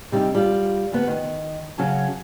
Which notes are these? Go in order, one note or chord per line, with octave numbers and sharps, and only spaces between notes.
C3 G3 C#4 D#4
G3 F4
D2 B3
D#3
C#3 F#3 C#4 A5